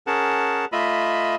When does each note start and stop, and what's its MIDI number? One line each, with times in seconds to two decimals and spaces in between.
0.07 0.65 61
0.07 0.65 68
0.07 0.65 70
0.07 0.65 78
0.07 0.65 81
0.72 1.35 57
0.72 1.35 65
0.72 1.35 75
0.72 1.35 76
0.72 1.35 83